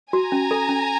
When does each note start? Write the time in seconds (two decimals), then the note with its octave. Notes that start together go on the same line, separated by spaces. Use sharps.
0.13 F#4 G#5 A#5
0.32 C#4
0.51 A4
0.69 C#4